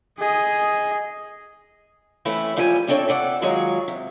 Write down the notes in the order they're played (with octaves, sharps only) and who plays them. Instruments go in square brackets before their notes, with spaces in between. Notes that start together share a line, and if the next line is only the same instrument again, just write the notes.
[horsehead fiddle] G#4 D#5
[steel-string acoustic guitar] E3 A3 C4 C#4 E4
D#2 F3 G3 G4 G#4 G#5
G3 C4 D4 A4 C#5 E5
C3 A4 D5 F#5
D#3 F#3 G#3 F4 G#4 C#5
C3